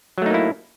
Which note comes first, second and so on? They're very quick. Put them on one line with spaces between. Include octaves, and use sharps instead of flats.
F#3 A3 D#4 A#3 E4